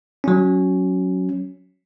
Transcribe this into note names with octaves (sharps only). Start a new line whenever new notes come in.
F#3 C#4